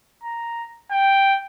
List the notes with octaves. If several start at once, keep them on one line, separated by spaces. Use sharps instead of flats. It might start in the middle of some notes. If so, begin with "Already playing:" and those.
A#5
G5